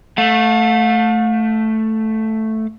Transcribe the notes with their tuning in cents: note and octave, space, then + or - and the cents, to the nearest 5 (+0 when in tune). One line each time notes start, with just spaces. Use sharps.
A3 +0 F5 +45